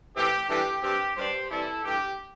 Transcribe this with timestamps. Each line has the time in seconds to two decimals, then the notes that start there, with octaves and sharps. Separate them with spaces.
0.16 A2 E3 C4 G4
0.49 G2 E3 A3 D4 G4
0.83 G2 G3 C4 G4
1.17 G2 G3 D4 G4 C5
1.50 C3 E3 G3 E4 A4
1.84 G2 E3 A3 G4